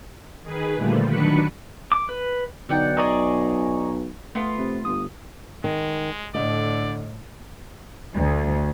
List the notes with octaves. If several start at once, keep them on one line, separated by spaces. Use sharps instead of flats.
D#3 G#4 B4
A#2 D3 F3 G3 A3
D#3 F#3 D4 B4 B5 C#7
D6
B4
B1 D3 D#4 D5 F#5 G5
G#4 D5 D#5 G#5 A#5 C#6
A3 B3 F4
C3
G1 D#6
D#3 G#3
A2 D3 D5 D#5
D2